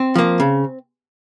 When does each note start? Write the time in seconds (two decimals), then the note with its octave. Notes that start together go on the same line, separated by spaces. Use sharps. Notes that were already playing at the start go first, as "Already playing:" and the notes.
Already playing: C4
0.16 F3 A#3
0.40 C#3